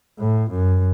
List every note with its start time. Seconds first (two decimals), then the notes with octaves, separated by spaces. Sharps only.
0.19 A2
0.50 F#2